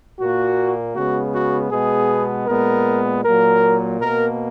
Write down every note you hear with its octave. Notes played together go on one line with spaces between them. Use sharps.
A#2 A#3 F#4
C#3 G#3 B3 F#4
F#4
B2 G#3 B3 G#4
A#2 G#3 B3 A#4
A#2 F#3 A#3 A#4
B2 A#3 A#4